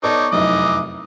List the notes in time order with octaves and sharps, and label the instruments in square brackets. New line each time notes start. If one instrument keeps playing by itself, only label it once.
[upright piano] B3 A4 D5 [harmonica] D#4 C#5 D6
[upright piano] F1 F#2 D#4 [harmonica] E3 D#5 D6